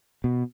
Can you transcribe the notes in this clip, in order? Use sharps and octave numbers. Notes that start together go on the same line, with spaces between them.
B2